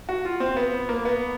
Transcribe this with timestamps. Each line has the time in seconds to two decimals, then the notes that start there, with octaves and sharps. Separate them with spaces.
0.09 F#4
0.25 F4
0.40 C4
0.56 B3
0.89 A#3
1.05 B3